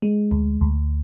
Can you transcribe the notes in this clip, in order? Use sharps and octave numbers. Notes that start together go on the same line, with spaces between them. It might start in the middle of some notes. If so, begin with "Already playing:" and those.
G#3
D2
D2